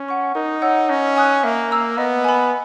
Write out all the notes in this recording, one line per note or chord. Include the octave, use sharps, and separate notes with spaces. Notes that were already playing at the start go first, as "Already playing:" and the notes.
Already playing: C#4
F#5 C#6
D#4 A#4
C#5 F#5 A#5 E6
C#4 D#5
G#5 D#6 F#6
A#3 E5
A#5 E6
B3 D#5
G#5 B5